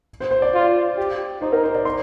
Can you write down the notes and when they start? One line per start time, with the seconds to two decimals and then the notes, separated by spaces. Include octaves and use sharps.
0.20 C5
0.31 C5
0.42 D5
0.54 F4
0.97 G4
1.41 D#4 C5
1.52 A#4
1.64 C5
1.75 D5
1.85 C6